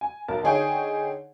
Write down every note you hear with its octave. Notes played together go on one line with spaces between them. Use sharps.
G#5
B1 A#4 A5
D3 D#4 G#4 C#5 G5